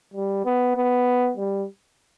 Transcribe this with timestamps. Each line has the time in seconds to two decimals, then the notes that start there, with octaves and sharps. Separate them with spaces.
0.14 G3
0.45 B3
0.76 B3
1.37 G3